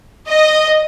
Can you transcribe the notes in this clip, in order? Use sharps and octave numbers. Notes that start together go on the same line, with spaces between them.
D#5